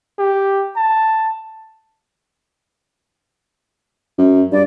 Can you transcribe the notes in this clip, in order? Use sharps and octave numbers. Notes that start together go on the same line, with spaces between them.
G4
A5
F#2
G2 D5